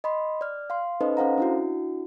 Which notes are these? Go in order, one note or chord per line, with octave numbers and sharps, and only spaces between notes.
D#5 B5 C6
D5 F6
F5 C6
C#4 D#4 A4 B4 C5 D#5
C#4 A4 C5 F5 F#5 A#5
D4 E4 F#4